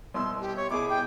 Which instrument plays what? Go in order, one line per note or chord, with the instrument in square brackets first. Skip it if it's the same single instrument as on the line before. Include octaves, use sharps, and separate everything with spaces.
[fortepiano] C2 B2 E6 [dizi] C6
[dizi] G4
C#5
[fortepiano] B2 E4 G#4 [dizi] D6
[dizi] G5